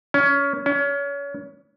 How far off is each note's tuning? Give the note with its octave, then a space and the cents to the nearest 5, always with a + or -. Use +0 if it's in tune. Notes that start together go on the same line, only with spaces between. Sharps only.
C#4 +20
C#4 +30